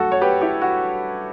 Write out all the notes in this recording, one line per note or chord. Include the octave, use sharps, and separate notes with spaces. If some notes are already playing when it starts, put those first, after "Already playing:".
Already playing: G2 F#3 A3 F#4 A4
C#5
G4 B4
E4 G4
F#4